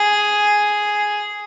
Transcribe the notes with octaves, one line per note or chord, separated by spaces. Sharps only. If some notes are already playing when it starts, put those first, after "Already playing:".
Already playing: G#4